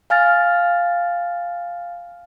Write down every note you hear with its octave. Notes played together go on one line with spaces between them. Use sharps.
F5 G#5 F6 A6